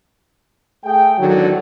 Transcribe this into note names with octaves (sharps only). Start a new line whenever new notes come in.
A3 G#4 G5
E2 G#2 D3 D#3 F#3